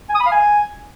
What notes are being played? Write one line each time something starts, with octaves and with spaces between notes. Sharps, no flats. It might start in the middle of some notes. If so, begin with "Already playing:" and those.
G#5
D#6
B5
F5
G#5